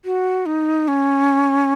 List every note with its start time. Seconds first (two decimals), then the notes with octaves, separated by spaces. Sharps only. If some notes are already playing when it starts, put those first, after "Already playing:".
0.05 F#4
0.46 D#4
0.88 C#4